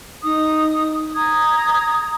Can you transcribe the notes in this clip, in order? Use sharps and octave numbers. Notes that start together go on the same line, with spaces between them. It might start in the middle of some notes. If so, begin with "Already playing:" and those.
D#4 D#6
A#5 D#6 G#6